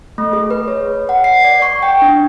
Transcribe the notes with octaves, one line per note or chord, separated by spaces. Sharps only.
A3
G#4
B4
C#5
F#5
C7
D5
C#6
G5
D4